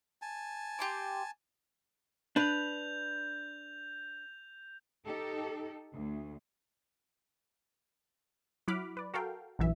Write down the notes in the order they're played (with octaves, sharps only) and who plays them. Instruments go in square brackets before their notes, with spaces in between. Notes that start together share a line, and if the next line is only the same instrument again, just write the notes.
[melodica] G#5 A5
[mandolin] G4 C6 D6
[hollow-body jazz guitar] D4 B4 [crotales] G6 F7
[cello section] D#4 G4 A4
D2
[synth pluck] F#3 E4 F#5 B5 D6 F6
B4 D5
F#4 A4 A#4 F5 G5
A#1 F#2 E3 E5